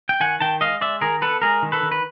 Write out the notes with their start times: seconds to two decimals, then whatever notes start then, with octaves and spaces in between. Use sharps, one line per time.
0.09 G5
0.20 D#3 F#5 G#5
0.40 D#3 G5 A5
0.61 G#3 D#5 F5
0.81 G#3 D5 E5
1.01 D#3 G#4 A#4
1.21 B3 A4 B4
1.42 G#3 G#4 A#4
1.63 D#3
1.72 A4 B4
1.83 D#3
1.92 B4